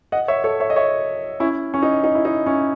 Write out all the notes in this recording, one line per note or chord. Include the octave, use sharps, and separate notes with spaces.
D#5 F#5
C#5 E5
A4 C#5
C#5 E5
D#5
C#5 E5
C#4 E4
C#4
D#4
D#4
E4
D#4
C#4 E4